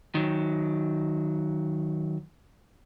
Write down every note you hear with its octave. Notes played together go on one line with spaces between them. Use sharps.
D#3 F#3